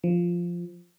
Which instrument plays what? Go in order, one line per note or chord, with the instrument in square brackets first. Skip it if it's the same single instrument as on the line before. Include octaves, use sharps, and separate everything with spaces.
[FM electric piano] F3